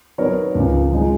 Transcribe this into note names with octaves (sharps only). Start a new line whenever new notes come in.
F#3 B3 D#4 A#4 C#5
C#2 C#3 F3
F3 G#3 D#4